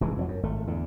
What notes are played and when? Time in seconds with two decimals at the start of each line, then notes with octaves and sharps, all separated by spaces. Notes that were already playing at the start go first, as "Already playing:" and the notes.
0.01 F1 E3 G#3
0.17 F2 F3 F#3
0.28 F#2
0.43 G#1 A3
0.67 E2 D3